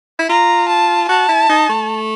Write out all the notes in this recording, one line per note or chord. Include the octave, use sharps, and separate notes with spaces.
E4
F4 A#5
A5
F#4 A5
E4
D#4
A3